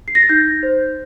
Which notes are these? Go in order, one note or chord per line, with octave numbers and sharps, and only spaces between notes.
C7
A#6
A6
D#4 G6
C5